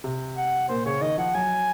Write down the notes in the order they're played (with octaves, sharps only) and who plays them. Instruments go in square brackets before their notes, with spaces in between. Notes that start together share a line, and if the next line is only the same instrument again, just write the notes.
[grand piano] C3
[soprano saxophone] F#5
[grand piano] A#2 [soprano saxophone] C5
[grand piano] C#3 [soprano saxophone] C#5
[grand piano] D#3 [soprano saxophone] D#5
[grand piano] F3 [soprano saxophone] F#5
[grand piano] F#3 [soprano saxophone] G#5